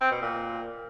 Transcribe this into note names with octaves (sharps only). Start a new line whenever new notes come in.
C4
B2
A#2